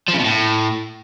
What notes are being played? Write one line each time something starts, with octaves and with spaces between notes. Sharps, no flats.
F3
C#3
B2
A2